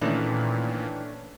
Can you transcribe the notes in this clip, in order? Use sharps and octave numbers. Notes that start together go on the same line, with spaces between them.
A#2 D#3 E3 A3 C#4 D4